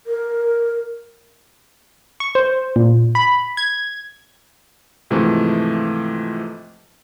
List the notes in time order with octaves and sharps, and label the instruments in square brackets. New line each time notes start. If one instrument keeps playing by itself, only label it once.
[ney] A#4
[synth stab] C#6
C5
A#2
B5
G#6
[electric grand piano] G#2 C3 E3 F3 A3